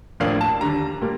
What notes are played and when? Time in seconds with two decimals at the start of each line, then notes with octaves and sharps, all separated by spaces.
0.20 A1 A2 F3 A#3 D4 F5
0.41 A5
0.60 D#2 D3 G3 A#5
1.01 A#2 G3 A#3